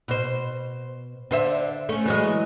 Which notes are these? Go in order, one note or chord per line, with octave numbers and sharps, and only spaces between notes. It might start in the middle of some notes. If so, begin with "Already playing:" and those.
B2 C5
D3 C5 E5
A3 C#4
E3 F#3 G#3